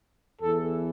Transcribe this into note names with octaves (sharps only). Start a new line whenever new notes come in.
E2 E3 A4